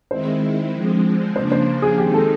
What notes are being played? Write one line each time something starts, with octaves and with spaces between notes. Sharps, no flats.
D#3 G#3 C4 E4 C5
D3 F3 G#3 C4
C#3 F3 A#3 D4 C5
C5
G#4
D#3 G#3 C4 D#4 G4
A4